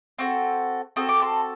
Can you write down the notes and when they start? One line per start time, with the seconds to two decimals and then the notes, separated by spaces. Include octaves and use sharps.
0.19 C4 F#4 A4
0.96 C4 F#4 A4 D#6
1.09 D6
1.22 A5 C6